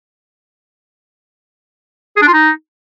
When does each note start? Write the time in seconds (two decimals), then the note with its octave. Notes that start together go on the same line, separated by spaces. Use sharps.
2.16 G#4
2.22 D4
2.28 F4
2.33 D#4